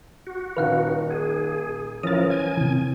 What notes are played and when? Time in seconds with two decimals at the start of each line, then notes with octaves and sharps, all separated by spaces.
0.27 F#4
0.57 D#1 D#4 B4 F5 F#5
1.11 G#4
2.03 E3 F3 C#4 A#4 D#6 A6
2.30 G#5
2.57 C3 E3